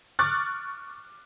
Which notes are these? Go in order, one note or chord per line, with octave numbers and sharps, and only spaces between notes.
C#6 D6 F6 F#6 A6